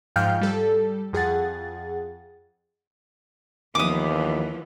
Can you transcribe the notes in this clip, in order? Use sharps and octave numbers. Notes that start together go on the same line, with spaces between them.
G#2 F3 F5 G5 F6 G6
G3 A4
F2 G#4 F#5 A6
D#2 E3 F3 B3 D6 D#6